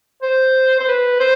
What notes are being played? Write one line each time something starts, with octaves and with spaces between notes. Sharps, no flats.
C5
C5
B4
C5